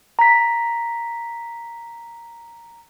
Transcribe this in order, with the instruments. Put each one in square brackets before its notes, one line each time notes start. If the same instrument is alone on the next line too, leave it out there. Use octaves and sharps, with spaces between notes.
[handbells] A#5 B6